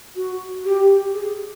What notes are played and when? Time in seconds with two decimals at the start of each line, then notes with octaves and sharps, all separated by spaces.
0.16 F#4
0.65 G4
1.14 G#4